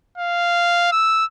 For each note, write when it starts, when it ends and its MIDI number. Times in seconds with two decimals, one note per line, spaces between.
0.18 0.90 77
0.92 1.25 88